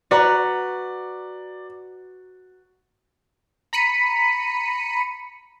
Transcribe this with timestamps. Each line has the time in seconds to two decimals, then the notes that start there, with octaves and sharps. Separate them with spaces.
0.11 F#4 B4 D5 A#5
3.73 A#5 B5 B6 C#7 D#7